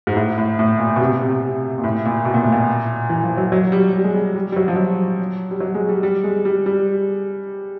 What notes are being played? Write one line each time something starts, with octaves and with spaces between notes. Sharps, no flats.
G#2
A2
A2
A2
A#2
B2
C3
C3
A#2
A2
A#2
B2
A#2
A2
A#2
E3
F3
F#3
F#3
G3
G3
G#3
G3
G3
G3
F#3
F3
F#3
G3
F#3
G#3
G3
G3
G#3
G3
G3